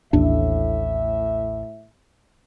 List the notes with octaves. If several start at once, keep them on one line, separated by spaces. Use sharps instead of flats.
A1 D#2 A2 D4 E5